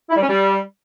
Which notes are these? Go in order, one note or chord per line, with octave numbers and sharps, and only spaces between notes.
E4
G3
C#4
G3